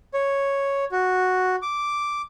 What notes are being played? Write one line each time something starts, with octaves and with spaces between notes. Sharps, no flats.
C#5
F#4
D6